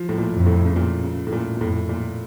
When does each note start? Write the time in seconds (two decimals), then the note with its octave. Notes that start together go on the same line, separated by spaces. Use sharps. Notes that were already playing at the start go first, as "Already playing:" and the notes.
Already playing: F3
0.09 A2
0.18 A#2
0.32 F2
0.46 A2
0.65 C#3
0.76 A#2
1.04 C#3
1.27 A2
1.32 A#2
1.57 A#2
1.61 F2 A2
1.89 A#2